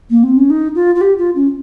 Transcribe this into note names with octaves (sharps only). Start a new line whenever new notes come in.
A#3
C4
C#4
D#4
F4
F4
G4
F4
C#4